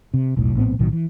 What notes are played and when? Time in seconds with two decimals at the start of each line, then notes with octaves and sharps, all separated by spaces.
0.14 C3
0.37 E1 B1 A2
0.55 A#1 A2 B3 C4
0.79 B1 A2 D#3 F#3
0.92 E3